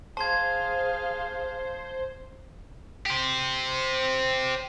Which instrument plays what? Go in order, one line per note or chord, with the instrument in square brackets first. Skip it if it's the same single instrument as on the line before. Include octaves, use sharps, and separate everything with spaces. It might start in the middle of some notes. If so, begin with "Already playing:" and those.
[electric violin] G#4 F5 [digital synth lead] C5 [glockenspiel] A5 C6 G#6
[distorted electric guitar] G4 C5